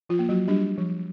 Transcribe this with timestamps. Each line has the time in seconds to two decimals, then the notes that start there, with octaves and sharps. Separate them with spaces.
0.09 F3 F4
0.19 A#3
0.29 F#3 F#4
0.48 G3 D4 G4
0.78 F3